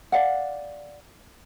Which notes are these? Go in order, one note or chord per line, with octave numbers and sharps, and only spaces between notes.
D5 F5 F#5